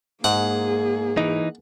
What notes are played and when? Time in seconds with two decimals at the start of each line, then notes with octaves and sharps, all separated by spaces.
0.24 G#2 A#3 G#4 F#5
1.17 E3 D#4